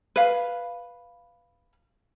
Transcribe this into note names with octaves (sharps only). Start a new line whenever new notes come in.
B4 F5